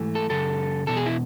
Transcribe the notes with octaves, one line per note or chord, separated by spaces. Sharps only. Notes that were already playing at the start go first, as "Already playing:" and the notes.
Already playing: G#2 E3 A3
A4
F#2 C#3 A4
E2 B2 A4
G#4
E4